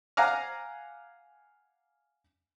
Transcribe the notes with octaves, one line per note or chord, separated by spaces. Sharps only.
F5 F#5 G#5 A#5 D6 F6